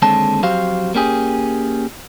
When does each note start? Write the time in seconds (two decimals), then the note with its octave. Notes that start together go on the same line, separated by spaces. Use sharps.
0.02 D#2 D3 G#3 C4 C#5 A5
0.43 F2 F#3 F#4 G4 C5 F5
0.95 A#3 C#4 G4 G#4